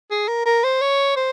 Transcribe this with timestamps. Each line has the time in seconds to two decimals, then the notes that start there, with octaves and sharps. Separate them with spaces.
0.11 G#4
0.28 A#4
0.46 A#4
0.64 C5
0.82 C#5
1.17 C5